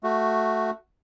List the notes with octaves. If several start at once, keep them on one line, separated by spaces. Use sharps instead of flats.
A3 F#4